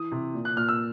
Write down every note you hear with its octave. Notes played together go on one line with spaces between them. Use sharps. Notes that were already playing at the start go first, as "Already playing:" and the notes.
Already playing: E3 D#6
C3
A#2
F#6
A#2 F6
E6